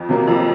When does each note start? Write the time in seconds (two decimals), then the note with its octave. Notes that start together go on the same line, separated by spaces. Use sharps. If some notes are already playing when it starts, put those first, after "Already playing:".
Already playing: F2
0.09 C3 F#3 A#3
0.27 F2